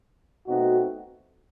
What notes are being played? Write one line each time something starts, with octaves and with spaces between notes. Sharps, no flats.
B2 A3 C4 D#4 F#4